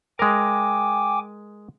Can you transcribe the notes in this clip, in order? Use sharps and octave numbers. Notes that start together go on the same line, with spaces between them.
G#3 A#4 G5 G#5 D6